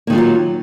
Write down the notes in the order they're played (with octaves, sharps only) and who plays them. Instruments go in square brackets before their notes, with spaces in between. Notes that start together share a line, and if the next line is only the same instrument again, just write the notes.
[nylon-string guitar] A#3
D#3
G#3
F4
F#3